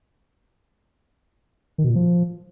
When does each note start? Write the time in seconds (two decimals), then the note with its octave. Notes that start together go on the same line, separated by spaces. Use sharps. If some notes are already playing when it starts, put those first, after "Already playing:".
1.78 D#3
1.84 B2
1.90 A#2
1.96 F3